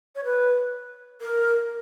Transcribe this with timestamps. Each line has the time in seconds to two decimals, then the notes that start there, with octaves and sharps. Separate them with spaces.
0.15 C#5
0.24 B4
1.21 A#4